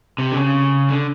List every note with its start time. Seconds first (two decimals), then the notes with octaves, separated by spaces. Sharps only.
0.18 C3
0.32 D3
0.36 C#3
0.89 D3